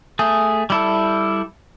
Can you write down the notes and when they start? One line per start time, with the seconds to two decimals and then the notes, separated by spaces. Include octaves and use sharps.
0.19 A3 G#4
0.70 G3 E4 A4